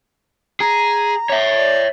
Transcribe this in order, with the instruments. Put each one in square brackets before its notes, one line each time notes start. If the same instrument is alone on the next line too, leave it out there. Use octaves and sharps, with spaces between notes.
[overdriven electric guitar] G#4 [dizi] A#5
[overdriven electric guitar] C#5 E5
[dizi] D5